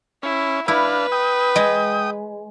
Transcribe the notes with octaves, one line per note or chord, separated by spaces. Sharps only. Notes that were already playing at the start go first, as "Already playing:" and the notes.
C#4 E4
D4 E4 B4 F5
G5 D#6
G#3